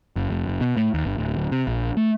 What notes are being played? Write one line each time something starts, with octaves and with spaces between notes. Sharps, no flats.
F#1
F1
F#1
B2
A2
D#2
G1
D1
D1
C3
A#1
A3